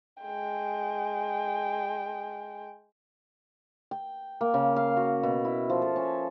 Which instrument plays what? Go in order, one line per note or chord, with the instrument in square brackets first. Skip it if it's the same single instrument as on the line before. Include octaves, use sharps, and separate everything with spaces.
[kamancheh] G#3 G5
[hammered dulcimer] G5
A#3
C#3
F5
F#4
B2
E4
F3
A4
C#4